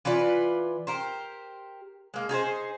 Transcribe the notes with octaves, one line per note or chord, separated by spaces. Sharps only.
E3 F4 B4 D5
G4 A#4 C5
G#3 A#3
D#4 G#4 A#4 C5